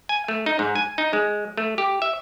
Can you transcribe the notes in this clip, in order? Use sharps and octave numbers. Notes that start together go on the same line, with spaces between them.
G#5
A3
D#4
G#2
G#5
D#4
G#3
A3
G4
E5